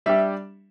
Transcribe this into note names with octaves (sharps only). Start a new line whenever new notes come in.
G3 D4 G4 E5